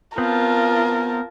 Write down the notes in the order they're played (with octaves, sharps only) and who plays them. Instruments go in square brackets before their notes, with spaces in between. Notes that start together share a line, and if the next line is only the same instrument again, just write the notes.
[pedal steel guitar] B3 C4 [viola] F4 A5 [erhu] A#4